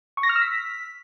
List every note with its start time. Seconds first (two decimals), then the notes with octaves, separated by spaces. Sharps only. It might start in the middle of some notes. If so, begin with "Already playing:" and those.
0.17 C#6
0.23 A#6
0.29 F6
0.35 E6
0.42 B6